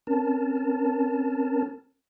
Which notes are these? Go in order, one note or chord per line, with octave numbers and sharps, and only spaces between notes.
C4 C#4 A#4 A5